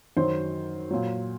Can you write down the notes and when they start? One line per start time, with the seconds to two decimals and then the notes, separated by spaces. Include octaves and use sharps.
0.17 F#2 D#3 F#3 C5
0.91 A#2 F#3